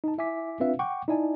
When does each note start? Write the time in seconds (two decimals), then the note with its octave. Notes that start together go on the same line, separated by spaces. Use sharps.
0.04 D#4 A5
0.18 E4 E5 G#5 D6 B6
0.60 C4 D4 F4 B4 E5 F5
0.79 F#5 G5 C#6 D6
1.08 D#4 E4 D5 G#5 A5